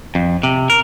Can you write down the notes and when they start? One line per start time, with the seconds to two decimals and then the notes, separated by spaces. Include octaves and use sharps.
0.15 F2
0.43 C3
0.70 A#4